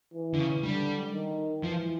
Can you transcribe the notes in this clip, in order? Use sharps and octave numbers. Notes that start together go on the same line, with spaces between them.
E3
D3
C#3
D3 G3
D#3
E3 F3